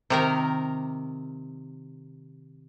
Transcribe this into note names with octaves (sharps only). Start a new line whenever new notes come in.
C3 D#3 A#4